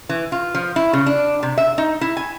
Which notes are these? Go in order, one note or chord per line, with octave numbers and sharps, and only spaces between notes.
E3
F4
F3
E4
C#3
D4
C3
E5
D#4
E4
G#5